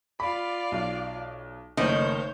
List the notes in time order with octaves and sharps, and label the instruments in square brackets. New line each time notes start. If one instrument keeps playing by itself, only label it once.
[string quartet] F4 D5 F5 [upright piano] B5
[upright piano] B1
[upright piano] F#1 A3 [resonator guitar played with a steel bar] D#3 [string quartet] C5 C#5 G6